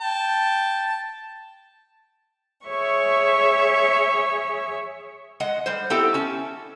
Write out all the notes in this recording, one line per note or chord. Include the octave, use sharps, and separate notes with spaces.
G5 A5
G#4 C#5 E5 C#6
G#3 D#5 F#5
G3 C5
B3 C4 E4 G4 A4
C#4 A5